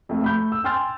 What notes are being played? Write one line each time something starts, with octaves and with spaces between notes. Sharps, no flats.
F2 A3
A3 B5 G6
E6
G5 G#5 C6 F6 G6 A6